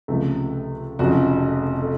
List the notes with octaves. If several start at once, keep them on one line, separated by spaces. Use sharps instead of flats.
C#2 C3 F3 A3 A4
F1 F2 C#3 F3 F#4
A4